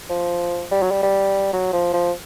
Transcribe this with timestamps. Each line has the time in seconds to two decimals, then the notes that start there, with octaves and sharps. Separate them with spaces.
0.10 F3
0.71 G3
0.82 F#3
0.91 G3
1.03 G3
1.53 F#3
1.73 F3
1.93 F3